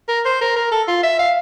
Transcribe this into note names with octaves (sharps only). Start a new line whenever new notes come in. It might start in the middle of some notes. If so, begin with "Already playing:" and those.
A#4
C5
A#4
A#4
A4
F4
E5
F5